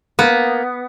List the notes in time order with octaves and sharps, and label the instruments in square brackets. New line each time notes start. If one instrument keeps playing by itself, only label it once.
[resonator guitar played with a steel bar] A#3 [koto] B3